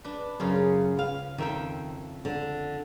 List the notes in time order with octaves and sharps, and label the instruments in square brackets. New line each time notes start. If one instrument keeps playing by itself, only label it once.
[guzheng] D4 B4
[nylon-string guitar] F#2 [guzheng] C#3 F4 G#4
[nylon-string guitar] B4 F5
[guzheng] F2 E5 G5 [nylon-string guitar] D#3
[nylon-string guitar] D3